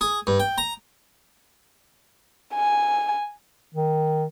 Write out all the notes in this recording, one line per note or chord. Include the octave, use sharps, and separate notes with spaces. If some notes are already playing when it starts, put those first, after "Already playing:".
G#4
G2
G5
A#5
G#5
D#3